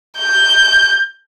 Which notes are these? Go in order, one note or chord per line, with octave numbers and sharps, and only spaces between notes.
G6